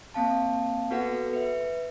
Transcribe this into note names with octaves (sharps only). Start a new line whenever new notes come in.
A#3 C4 F5 A5
B3 F#4 A4 B4 F#5
B4 E5